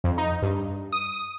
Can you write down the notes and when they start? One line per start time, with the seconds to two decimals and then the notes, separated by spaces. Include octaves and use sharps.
0.04 F2
0.18 D#4
0.42 G2
0.92 D#6